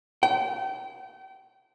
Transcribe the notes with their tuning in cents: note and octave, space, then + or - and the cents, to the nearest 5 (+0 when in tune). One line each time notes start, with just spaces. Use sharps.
G5 -35